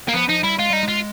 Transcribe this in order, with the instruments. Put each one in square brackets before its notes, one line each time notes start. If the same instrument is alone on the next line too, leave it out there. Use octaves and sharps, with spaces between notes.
[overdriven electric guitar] A#3
[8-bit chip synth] F3 [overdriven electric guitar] B3
[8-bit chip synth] F3 [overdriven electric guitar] D#4
[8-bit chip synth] G3 [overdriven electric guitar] E4
[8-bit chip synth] G#3 [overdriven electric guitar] F4
[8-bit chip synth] G3 [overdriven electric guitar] D#4
[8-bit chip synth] G#3
[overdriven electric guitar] F4